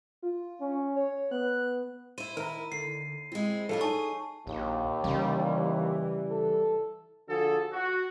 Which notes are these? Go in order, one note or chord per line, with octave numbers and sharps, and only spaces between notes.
F4
C#4
C#5
B3 F#6
E4 C5 D#7
D#3 E4 A#4 A#5
D#2 D3 C7
G#3 C4 E4
F3 G3 D4 A4 C#5
D#4 G#4 G#5 A5 C#6
A#1 D#2
C#3 E3 G3
A4
D3 F3 F#4 G#4 A4
F#4